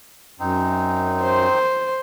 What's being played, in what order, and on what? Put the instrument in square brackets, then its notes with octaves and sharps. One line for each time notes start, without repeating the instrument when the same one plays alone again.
[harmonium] F#2 [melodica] C4 D#4
[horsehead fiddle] C5